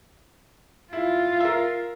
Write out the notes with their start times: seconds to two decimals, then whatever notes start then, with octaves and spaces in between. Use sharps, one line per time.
0.93 E4 F4
1.40 A#4 E5